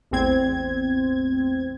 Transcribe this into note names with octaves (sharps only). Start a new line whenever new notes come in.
A1 E2 C4 G#6